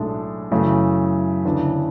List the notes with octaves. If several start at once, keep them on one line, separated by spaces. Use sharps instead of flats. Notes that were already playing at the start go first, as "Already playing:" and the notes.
Already playing: B1 A2 G#3 D4 A4
F#2 C#3 E3 A3
D2 C#3 E3 B3 D4